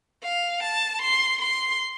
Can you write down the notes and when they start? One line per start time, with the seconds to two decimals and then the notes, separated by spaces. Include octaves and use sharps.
0.23 F5
0.63 A5
1.02 C6
1.41 C6